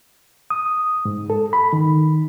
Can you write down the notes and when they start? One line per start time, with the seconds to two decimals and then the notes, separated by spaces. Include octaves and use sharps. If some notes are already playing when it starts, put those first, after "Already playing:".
0.50 D#6
1.05 G#2
1.30 A4
1.53 B5
1.73 D#3